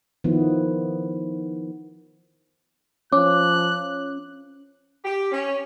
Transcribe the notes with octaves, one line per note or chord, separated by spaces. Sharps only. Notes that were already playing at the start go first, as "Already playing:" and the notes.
D#3 F3 B3 E4
F3 C#4 D6 F#6
G4
C#4